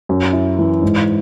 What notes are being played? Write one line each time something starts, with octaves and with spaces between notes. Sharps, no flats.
F#2
E4
E3
G#2